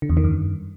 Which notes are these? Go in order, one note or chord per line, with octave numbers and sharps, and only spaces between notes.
D3
E2
D#3
F#2
G2